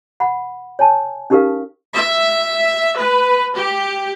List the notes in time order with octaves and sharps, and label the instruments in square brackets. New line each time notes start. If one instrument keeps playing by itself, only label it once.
[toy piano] F#5 B5
C#5 G#5 A5
C#4 D#4 G4 A#4 B4 F5
[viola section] E5
B4
G4